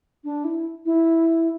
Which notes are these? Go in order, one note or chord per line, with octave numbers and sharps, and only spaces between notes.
D4
E4
E4